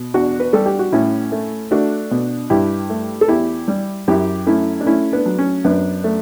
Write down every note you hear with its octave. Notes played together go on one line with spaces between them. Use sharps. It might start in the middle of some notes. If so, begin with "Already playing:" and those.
Already playing: B2
E2 D4 F#4
B4
G3 A4
G4
F#4
A2 C#4 E4
A3
A3 D4 F#4
B2
G2 E4 G4
A3
A4
E2 E4 G4
G3
F#2 E4 G4
A3 C#4 E4
D4
A3 C#4 E4
B3 D4
F#3
C#4
F#2 B3 D4
A3